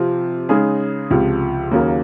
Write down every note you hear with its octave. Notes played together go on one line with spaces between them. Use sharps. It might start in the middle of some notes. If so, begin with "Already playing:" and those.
Already playing: C3 F3 C4
C#3 G#3 D#4 G#4
C#2 C3 F3
D#2 C#3 F#3 A#3